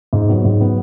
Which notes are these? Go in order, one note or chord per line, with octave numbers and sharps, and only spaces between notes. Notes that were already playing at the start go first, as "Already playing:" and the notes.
G#2
F#3 B3
G#2
F#3 B3